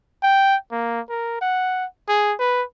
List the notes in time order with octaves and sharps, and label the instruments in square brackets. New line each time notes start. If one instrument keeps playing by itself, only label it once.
[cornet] G5
A#3
A#4
F#5
G#4
B4